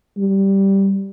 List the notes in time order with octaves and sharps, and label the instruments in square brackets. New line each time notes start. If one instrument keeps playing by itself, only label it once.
[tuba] G3